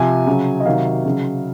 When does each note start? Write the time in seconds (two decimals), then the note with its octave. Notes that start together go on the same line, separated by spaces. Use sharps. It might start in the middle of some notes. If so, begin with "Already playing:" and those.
Already playing: C3 F3 G#5
0.27 C#3 F#3
0.60 D#5
0.66 C3 D#3 F#3 F5
1.05 C#3 F#3